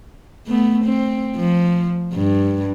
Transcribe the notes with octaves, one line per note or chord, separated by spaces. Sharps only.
A3 B3
C4
F3
G2